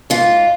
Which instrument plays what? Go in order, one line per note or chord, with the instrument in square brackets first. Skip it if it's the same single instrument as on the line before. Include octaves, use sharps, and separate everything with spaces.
[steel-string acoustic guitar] G#2 F4